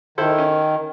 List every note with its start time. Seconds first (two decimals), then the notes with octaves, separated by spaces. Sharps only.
0.18 D#3 E4 A4 C5
0.38 C#4